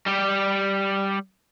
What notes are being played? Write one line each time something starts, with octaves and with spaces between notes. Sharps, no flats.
G3 G4